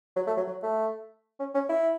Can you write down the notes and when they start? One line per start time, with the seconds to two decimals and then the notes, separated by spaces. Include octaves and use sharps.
0.16 F#3
0.27 A3
0.37 F#3
0.47 F#3
0.63 A3
1.39 C#4
1.55 C#4
1.69 E4